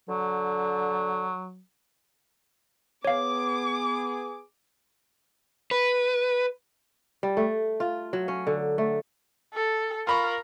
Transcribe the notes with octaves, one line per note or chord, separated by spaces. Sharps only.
D3 F#3
B3 G#4 C#5 F5 D6
B4
G3
A3
F4
F#3
C#4
D3
A3
A4
F4 A#4 B5 C#6